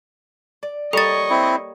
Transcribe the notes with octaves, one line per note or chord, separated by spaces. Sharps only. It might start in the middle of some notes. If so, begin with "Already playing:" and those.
D5
G3 A#3 A4 C#5 D#5 C#6 A6
C4 E4